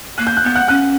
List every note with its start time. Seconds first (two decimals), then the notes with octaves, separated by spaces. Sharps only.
0.18 A#3 F#6
0.27 G6
0.37 F#6
0.43 B3 G6
0.55 F#5 F#6
0.68 C#4 F#5 F#6